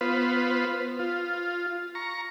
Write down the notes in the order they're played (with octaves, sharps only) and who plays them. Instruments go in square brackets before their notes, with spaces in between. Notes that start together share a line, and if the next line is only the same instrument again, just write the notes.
[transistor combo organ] B3 F4 B4 C5
F4
A#5 C#6